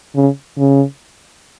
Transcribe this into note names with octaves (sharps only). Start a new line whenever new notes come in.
C#3
C#3